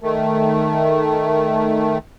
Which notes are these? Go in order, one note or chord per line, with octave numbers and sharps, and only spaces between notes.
D#3 A3